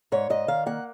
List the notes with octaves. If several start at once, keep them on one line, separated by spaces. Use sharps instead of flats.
G#2 C#5
G#2 D#5
D#3 F5
A#3 F#5